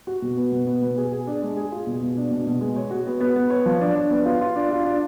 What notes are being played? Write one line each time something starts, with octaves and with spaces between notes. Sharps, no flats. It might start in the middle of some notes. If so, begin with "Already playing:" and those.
F#4
B2
B3
B2
B3
B2
G#4
G#4
D4
G#3
G#4
F4
B2
B2
D4
B2
B2
G#3
C#5
F#4
B3
B3
B3
C#5
F3
D4
D4
B3
F4
F4
D4
F4
D4